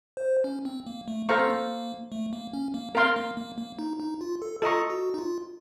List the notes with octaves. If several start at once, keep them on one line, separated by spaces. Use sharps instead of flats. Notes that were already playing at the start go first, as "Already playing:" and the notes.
C5
C#4
C4
A#3
A3
A#3 A4 C5 F5 A#5 C#6
C4
A#3
A3
A#3
C#4
A#3
C4 A#4 F5 C6
A#3
A#3
A#3
D#4
D#4
F4
A4
F4 A4 D#5 A#5 C#6
F#4
D#4
F4